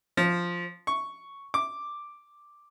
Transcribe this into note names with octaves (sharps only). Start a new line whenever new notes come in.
F3
C#6
D6